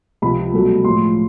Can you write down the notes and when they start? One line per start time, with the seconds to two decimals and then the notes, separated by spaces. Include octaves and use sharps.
0.22 C#2 C3 F3 G#3 B5
0.53 C2 B2 F#3 A3
0.84 A2 F3 G#3 C6